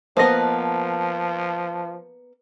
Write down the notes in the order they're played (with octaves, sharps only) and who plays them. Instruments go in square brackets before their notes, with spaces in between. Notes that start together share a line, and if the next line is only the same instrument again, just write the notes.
[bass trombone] F3 [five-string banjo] A#3 B3 [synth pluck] C5 D#5 A#6 [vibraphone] A5